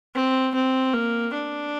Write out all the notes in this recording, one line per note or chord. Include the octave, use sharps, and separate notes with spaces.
C4
C4
A#3
D4